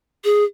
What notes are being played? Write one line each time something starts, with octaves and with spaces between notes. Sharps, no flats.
G#4